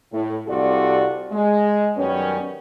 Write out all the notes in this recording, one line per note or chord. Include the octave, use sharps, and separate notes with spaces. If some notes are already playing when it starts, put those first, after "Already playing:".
A2
C2 C3 F4 F#4 A4 D5
G#3
F#2 D#3 G3 B3 C#4